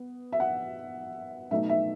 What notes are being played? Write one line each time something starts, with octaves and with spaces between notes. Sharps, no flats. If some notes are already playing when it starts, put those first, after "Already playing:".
Already playing: B3
E5
F#5
B2 F#3 A3 D#4 E5
E5